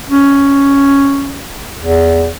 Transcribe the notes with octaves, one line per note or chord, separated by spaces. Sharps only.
C#4
E2